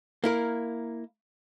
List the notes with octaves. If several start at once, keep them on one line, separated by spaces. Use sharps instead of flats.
A#3 E4 A#4